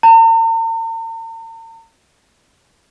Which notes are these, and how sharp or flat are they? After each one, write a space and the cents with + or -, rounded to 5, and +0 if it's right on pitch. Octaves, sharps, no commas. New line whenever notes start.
A#5 -45